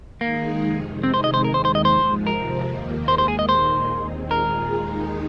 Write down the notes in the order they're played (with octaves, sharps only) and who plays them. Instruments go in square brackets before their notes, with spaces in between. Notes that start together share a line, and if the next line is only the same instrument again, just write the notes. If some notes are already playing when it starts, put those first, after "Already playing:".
[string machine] D#3 G#3 D#4 G#4 [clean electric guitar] A#3
[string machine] F2 C3 D#3
[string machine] C3 G#3 D#4 G#4 [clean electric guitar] C4
[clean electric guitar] C5
D#5
C5
[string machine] D#2 D#3 G#3 [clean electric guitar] A#4
[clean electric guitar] C5
C5
D#5
[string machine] G#2 F3 G#3 [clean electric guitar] C5
[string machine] F2 C3 F3 C4 [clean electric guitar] A#4
[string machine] D#2 D#3 A#3
[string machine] D#2 D#3 G#3 [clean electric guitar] C5
[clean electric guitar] C5
G#4
D#5
[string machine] A#2 A#3 D#4 G#4 [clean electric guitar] C5
[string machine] D#2 D#3 C4
[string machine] A#2 G#3 F4 G#4 [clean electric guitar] A#4
[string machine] D#2 D#3 G#3 D#4